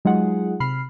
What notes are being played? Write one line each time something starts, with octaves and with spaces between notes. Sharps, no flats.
F#3 G#3 D#4 F4 G#4 F#5
C3 B5 F6 C7